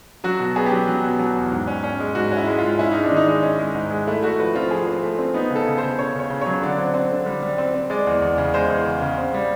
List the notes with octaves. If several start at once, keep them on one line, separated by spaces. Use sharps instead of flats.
F#3 F#4
B2
B3 G#4
G4
F#3
F#3
B2
F#3
E2
G#2
C#4
C#4
G#3
G#2 F#4
C#4
E4
G#3
G#2 F4
C#4 E4
G#3 D#4
D4
D#3
D#4
G#3
C#4
G#3
G#2
G#3
A3 E4
A3 F#4
F3 B4
C4 F4
F3 G#4
C4
A3
C4
B3 D#4
C#3
A4
C#3
C#3 C5
C#3 C#5
C#3 C#5
C#3
F#3 C#5
D3 D5
C4
C4
D3
G3
G3
C4
C4
G#3 D5
E2
E2
C#3
G#3 C5
E2
C#3
C#3
C4
G3